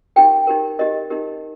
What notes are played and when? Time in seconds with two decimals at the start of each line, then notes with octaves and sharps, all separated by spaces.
0.16 D#4 G4 A#4 G5
0.47 D#4 G4 A#4
0.79 D#4 G4 A#4 D#5
1.10 D#4 G4 A#4